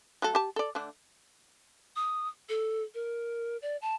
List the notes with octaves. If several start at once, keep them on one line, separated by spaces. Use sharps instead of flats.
F#3 A3 A4
G4 A5
A4 D5
D3 A3 D4
D#6
A4
A#4
D5
A5